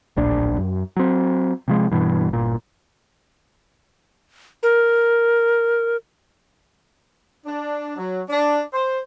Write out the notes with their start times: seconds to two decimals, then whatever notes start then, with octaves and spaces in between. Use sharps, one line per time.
0.16 D1 A#1 D4
0.58 F#2
0.96 F#3 C4
1.68 C3 F3 G#3
1.92 G2 B2 E3
2.29 G1 A#2
4.63 A#4
7.46 D4
7.97 F#3
8.30 D4
8.73 C5